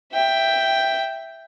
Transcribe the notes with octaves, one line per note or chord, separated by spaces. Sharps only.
E5 G5